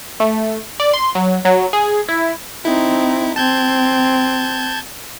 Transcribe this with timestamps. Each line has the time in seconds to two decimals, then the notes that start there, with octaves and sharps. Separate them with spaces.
0.20 A3
0.80 D5
0.93 C6
1.15 F#3
1.45 F#3
1.73 G#4
2.09 E4
2.65 C4 D#4 E4
3.36 C4 A5 G6 G#6